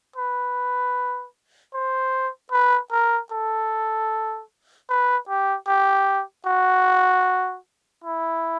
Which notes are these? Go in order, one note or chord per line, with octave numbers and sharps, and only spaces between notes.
B4
C5
B4
A#4
A4
B4
G4
G4
F#4
E4